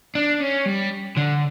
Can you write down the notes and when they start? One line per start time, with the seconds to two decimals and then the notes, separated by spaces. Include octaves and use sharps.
0.15 D4
0.40 C#4
0.66 G3
1.17 D3